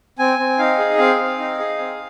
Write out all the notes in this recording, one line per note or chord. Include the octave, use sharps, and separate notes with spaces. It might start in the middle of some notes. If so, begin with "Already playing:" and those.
C4 G#5
C4
D#4 F5
G#4
C4 F5
C4
D#4
G#4
C4